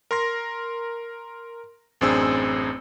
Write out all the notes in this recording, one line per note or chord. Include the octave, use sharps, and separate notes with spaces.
A#4 C6 A#6
A1 F#2 C4 D4 G#4 E6